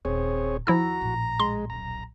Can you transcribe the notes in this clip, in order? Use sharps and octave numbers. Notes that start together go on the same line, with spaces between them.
D#1 C4 G#4 C#5
D#2 F3 E4 F#4 A#5 E6
A#1 A2
G#3 C6
D#1 B1 A#5